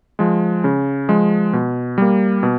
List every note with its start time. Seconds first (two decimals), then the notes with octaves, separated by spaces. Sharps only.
0.19 F3 G#3
0.64 C#3
1.08 F3 G#3
1.53 B2
1.98 G3 A#3
2.43 B2